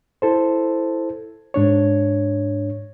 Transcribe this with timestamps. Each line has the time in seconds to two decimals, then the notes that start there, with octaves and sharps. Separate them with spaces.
0.22 E4 A4 C5
1.54 G#2 D4 C#5